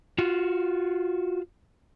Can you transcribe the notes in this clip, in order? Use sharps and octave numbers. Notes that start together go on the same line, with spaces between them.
F4 F#4